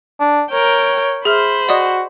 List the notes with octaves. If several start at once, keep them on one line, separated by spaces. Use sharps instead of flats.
D4
A#4 C#5 G5
G#4 C5 E5 B5 F6
F#4 D5 D#5 D#6